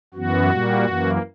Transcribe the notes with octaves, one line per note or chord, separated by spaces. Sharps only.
F#2 E3 B3 F#4
A#2 G3 A#3
F#2 E3 A#3